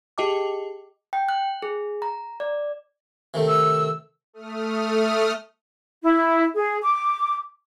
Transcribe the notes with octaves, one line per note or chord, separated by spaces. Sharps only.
G4 G#4 D#5 G5 A5 D6
G5
F#6
G#4
A#5
D5
C3 D#3 A3
E6
A3 D#6 F6
E4
G#4
D6